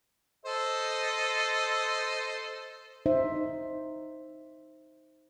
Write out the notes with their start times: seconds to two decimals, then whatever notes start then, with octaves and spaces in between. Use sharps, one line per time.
0.45 A4 C5 D#5
3.06 D#4 C5 E5